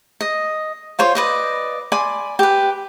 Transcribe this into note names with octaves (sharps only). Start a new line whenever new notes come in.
D#5
F4 C5 C#5
B4 D5 D#5
D5 G#5 B5 C6
G4 B4